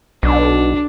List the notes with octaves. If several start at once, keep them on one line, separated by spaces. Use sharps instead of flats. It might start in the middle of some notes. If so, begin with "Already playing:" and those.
B1 D4